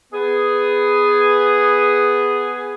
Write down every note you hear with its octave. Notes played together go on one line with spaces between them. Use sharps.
B3 G#4